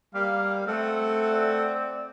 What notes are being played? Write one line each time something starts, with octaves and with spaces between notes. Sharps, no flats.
G3 A#3 F5
A3 C4 A4 F#5
D5